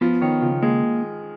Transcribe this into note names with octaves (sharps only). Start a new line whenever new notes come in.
F3 B3
D#3 C#5
C#3 F3
G#3 A#3